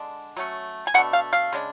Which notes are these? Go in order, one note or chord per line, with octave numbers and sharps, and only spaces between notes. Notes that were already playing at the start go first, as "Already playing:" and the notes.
Already playing: D3 G#3 D4
F#3 A3 C#4
G#5
B2 A3 D4 F#5
F5
F5
C#3 G#3 D4